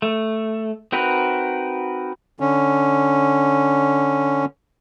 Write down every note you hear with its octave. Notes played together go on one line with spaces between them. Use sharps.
A3
C4 D#4 F#4 A#4 B4
D3 C#4